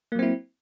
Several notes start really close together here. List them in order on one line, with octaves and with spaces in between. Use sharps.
A#3 F#3 C4 E4